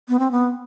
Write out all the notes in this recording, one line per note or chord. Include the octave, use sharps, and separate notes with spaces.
B3
C4
B3